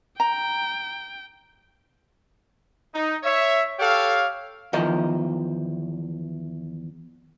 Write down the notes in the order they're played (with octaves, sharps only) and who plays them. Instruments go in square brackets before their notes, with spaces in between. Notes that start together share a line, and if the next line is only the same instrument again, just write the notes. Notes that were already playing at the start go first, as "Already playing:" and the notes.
[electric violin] G5 [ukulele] A#5
[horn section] D#4
C#5 E5
G4 A4 C#5 F5
[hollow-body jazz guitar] E2 D#3 F3 A#4 D#5